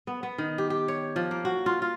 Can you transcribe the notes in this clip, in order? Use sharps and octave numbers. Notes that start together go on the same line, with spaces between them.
B3
B3
D#3
G4
G4
C#5
F3
A#3
F#4
F4
F4